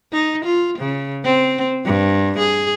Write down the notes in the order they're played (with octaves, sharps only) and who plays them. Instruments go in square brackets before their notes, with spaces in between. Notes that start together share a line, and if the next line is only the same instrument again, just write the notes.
[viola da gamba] D#4
F4
C#3
C4
G2
G#4